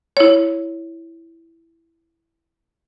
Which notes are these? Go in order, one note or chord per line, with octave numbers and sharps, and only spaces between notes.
E4 C#5